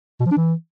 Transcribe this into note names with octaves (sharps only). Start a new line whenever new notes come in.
B2
F3
D4
E3